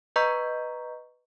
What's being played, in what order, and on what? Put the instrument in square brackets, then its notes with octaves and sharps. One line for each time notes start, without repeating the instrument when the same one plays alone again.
[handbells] B4 D#5 A#5 C#6 G6 B6